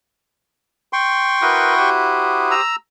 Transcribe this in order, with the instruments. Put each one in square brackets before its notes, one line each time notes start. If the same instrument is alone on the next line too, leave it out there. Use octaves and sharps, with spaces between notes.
[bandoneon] G5 C6 C#6
[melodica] E4 F#4 [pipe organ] A#4 B4 D#6
[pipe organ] G4 C5 D#6
[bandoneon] A#5 E6